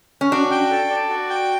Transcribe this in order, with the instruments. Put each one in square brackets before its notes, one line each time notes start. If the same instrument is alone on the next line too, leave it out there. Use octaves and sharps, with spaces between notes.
[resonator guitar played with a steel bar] C#4
[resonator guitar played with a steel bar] D4 [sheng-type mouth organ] F#4
[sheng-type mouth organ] G5
A4
D5
F#4
G5